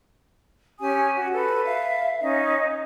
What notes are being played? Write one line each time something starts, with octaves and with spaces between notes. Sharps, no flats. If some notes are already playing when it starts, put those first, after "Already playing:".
C#4 G4 G#5 D#6
F#4
A4 B4
E5 F5
C#4 D#4 D#5